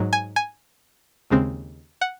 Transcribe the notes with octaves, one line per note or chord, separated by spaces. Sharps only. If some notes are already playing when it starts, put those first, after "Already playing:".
Already playing: G#2 F#3
G#5
G#5
D#2 C#3 G#3 C4
F#5